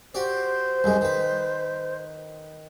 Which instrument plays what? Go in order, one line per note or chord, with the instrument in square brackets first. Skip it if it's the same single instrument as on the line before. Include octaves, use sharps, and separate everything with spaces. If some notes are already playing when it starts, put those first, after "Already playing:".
[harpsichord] F#4 G4 D5 [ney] C5
[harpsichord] C2 F#2 G#3
D#3 B4